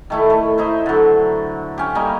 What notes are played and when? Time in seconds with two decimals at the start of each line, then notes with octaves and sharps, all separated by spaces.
0.10 D#3 A3 E4
0.30 A3
0.58 D#4 E4 C5
0.86 D3 F#3
1.78 C#4 G4
1.95 G3 A#3 D#4